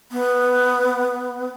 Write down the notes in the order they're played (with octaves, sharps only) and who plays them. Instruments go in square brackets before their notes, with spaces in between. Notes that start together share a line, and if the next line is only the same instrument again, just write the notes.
[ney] B3